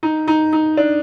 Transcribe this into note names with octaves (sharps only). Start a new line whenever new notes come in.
D#4
D#4
D#4
D4